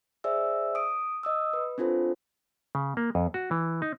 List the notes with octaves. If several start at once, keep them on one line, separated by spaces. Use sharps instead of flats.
G#4 C5 D5 E5 E6
D#6 D7
D#5 D#6 E6
B4
C4 D4 F4 A4 C5
C#3
A#3
F2
F#4
E3
D#4